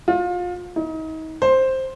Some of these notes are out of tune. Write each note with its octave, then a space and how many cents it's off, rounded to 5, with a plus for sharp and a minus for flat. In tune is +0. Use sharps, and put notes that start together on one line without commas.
F4 +30
D#4 +35
C5 +5